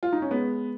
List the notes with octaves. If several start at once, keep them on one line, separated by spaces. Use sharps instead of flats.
F4
D#4
C#4
G#3 B3